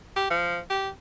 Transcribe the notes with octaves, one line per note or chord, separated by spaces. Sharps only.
G4
F3
G4